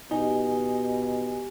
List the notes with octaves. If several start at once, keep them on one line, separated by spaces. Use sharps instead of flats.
B2 D#4 G4 G#5